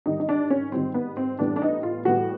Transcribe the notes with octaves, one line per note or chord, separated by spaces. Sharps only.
G#2 D#3 G3 D#4
D#4
D4
C#4
G#2 D#3 G3 C4
B3
C4
A2 E3 G3 B3 D4
D4
D#4
F4
A2 E3 G3 B3 F#4